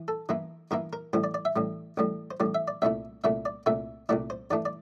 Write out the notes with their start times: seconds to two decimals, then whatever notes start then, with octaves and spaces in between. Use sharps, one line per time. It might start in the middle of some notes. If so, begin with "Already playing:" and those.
Already playing: E3
0.08 A4
0.29 G2 E3 A#3 E4
0.71 G2 E3 A#3 E4 A#4
0.93 A#4
1.13 A1 A2 G3 C5
1.24 D5
1.34 D5
1.45 E5
1.56 A1 A2 G3
1.97 A1 A2 G3
2.31 C5
2.40 A1 A2 G3 D5
2.55 E5
2.68 D5
2.82 C2 A#2 A3 E4 E5
3.24 C2 A#2 A3 E4 E5
3.45 D5
3.66 C2 A#2 A3 E4 E5
4.09 C2 A#2 A3 E4 D5
4.30 C5
4.51 G2 E3 A3 D4 D5
4.65 D5